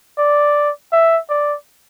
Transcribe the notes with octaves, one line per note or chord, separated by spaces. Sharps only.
D5
E5
D5